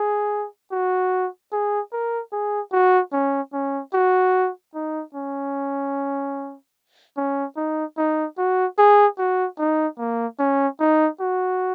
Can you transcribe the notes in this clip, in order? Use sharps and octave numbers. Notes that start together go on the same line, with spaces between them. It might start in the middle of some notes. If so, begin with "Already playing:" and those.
Already playing: G#4
F#4
G#4
A#4
G#4
F#4
C#4
C#4
F#4
D#4
C#4
C#4
D#4
D#4
F#4
G#4
F#4
D#4
A#3
C#4
D#4
F#4